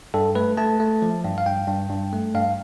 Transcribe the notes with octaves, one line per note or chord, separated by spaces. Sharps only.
G2 A4
A3 B4
A3 A5
A3
F3
G2
F5
G2 G5
G2
G2
A3
G2 F5